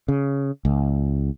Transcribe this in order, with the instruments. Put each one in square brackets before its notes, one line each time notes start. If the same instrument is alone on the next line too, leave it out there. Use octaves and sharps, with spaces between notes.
[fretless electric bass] C#3
C#2